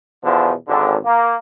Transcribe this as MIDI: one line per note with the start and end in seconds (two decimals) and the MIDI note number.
0.24 0.51 40
0.24 0.51 47
0.24 0.51 50
0.24 0.51 53
0.68 0.97 32
0.68 0.97 50
1.04 1.36 58